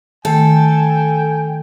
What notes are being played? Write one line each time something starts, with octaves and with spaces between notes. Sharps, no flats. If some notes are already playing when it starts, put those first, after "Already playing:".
D#3 A3 A4 G5 G#5